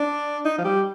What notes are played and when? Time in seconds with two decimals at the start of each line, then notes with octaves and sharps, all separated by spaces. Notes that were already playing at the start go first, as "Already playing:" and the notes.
Already playing: D4
0.45 D#4
0.58 F3
0.65 G3